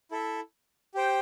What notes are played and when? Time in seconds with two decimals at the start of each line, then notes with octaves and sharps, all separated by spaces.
0.11 E4 A4 E5
0.95 G4 C5 G5